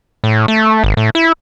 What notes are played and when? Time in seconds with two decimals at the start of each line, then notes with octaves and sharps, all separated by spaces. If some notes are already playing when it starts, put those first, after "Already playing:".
0.24 A2
0.48 A3
0.84 G#1
0.97 A2
1.15 E4